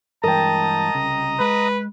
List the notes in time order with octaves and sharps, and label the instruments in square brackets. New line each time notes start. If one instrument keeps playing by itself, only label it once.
[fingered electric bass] G2 E3 G#3 [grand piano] A#4 G5 [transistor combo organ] D#5 A#5 [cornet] A5
[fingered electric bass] C2 C#3
[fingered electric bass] G#3 [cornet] B4